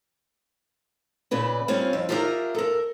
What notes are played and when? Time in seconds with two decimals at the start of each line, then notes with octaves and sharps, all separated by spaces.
1.31 A#2 C#3 B4 D5
1.68 G3 C4 C#4 F4 C#5
1.93 F2
2.09 F4 G4 G#4 A#4 E5 A#5
2.55 A4 A#4